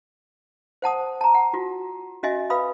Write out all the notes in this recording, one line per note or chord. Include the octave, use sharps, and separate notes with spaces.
C5 F#5 A5 D#6
A5 A#5
F#5
F4 F#4
C#4 F#4 D#5 E5 G#5
B4 F5 B5 D#6